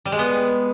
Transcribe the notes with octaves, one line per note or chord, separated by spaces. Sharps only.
G3
G#3
B3